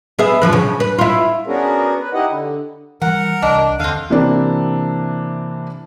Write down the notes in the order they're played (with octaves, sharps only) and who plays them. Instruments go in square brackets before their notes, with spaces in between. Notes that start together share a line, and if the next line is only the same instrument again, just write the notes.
[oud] B3 G#4 E5
F#2 F3 B4
C#3
B4
E4 F4
[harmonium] B3 C#4 D4 F#4 G#4 A#4
B4
D#4 E4 G4 D#5 F#5
D3
[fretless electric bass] E3 F#3 G3 [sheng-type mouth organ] A#4 [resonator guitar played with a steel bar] F#5
[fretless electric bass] C2 [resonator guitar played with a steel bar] D4 [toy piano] D#5
[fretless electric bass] D#2 [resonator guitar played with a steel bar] D3 C4 [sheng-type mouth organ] F5
[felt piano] C3 E3 A#3 C4 D4